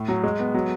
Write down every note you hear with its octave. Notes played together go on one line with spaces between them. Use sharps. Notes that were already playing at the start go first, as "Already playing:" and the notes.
Already playing: A2
F#3
G#3
B3
F#3